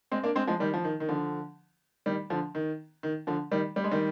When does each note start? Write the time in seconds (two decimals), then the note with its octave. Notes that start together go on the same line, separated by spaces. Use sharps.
0.11 G#3 C4
0.23 A#3 D4
0.35 G#3 C4
0.47 F3 G#3
0.60 D#3 G3
0.74 F3
0.84 D#3
1.00 D#3
1.08 D3 F3
2.06 D#3 G3
2.30 D3 F3
2.55 D#3
3.03 D#3
3.27 D3 F3
3.51 D#3 G3
3.76 G3
3.84 G#3
3.91 D#3 G3